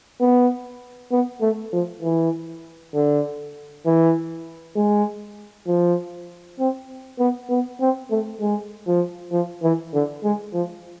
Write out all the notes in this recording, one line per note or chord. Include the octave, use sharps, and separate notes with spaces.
B3
B3
A3
F3
E3
D3
E3
G#3
F3
C4
B3
B3
C4
A3
G#3
F3
F3
E3
D3
G#3
F3